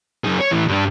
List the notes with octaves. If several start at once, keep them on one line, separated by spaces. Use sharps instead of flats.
F#2 G#4
C#5
A2 E3
G2 D4